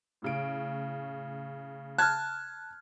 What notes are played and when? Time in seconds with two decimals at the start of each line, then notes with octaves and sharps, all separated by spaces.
0.22 A2 C#3 D7
1.98 A5 F6 F#6 G#6